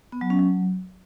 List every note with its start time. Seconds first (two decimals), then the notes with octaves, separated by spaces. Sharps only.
0.12 B3
0.21 F#3
0.30 C#4
0.39 F#3